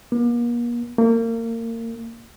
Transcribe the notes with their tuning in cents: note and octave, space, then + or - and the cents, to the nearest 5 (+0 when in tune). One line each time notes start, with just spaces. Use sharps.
A#3 +40
A#3 -30